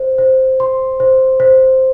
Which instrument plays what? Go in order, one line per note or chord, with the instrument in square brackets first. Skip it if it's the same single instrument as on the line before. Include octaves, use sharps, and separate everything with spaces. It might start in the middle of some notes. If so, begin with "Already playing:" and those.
Already playing: [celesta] C5
C5
C6
C5
C5